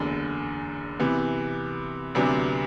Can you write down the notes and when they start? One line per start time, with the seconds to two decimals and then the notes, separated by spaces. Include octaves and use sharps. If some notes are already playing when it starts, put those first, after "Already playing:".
Already playing: F#1 E2 D3
1.00 C3 E3 B3
2.15 D2 C3 F#3 B3 D4